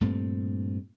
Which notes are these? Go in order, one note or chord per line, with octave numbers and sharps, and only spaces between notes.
G2 A#2 A3 C4